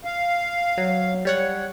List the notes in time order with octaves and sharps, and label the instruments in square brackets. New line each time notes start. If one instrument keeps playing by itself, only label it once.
[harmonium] F5
[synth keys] F#3
G3 C#5 F#5